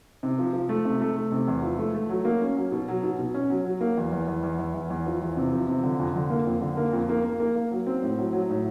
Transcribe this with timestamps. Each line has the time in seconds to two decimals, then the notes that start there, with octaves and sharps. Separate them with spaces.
0.23 C3
0.39 F3
0.53 F3
0.69 A3
0.85 C3
1.01 A3
1.17 A3
1.32 C3
1.48 E2
1.63 F3
1.79 A3
1.94 A3
2.09 F#3
2.25 A#3
2.41 C#4
2.56 F#3
2.72 B2
2.88 F#3
3.03 B2
3.19 B2
3.34 C#4
3.50 F#3
3.65 F#3
3.81 A#3
3.97 E2
4.12 E2
4.28 E2
4.43 E2
4.59 E2
4.74 E2
4.90 E2
5.07 F3
5.22 E2
5.37 C3
5.53 F3
5.69 C3
5.83 D3
6.00 F2
6.16 D3
6.30 A#3
6.47 F2
6.61 D3
6.77 A#3
6.93 F2
7.09 A#3
7.25 A#3
7.40 A#3
7.56 A#3
7.72 F#3
7.87 C4
8.03 A2
8.18 F#3
8.33 F#3
8.50 A2